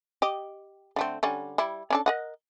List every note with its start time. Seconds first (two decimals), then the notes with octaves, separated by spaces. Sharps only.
0.22 G4 D#5
0.96 D3 A3 C4
1.23 D3 G3 C#4
1.58 G3 E4
1.90 C#4 D4 A4
2.06 A#4 D#5 F#5